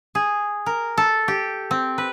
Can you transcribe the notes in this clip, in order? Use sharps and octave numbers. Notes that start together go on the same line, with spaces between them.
G#4
A#4
A4
G4
C4
B4